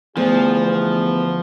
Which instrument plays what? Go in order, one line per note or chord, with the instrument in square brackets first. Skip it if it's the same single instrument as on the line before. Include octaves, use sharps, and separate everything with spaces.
[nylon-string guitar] D2 [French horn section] G2 E3 G#4 [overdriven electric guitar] F3 [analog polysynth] B3